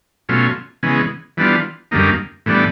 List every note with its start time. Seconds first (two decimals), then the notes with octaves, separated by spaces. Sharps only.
0.29 B2 F#3 A3 C#4 F4
0.83 C#3 E3 G#3 B3
1.37 E3 G3 B3 D4 F4
1.91 F#2 D3 G3 A#3 D#4
2.46 A2 E3 G3 B3 D4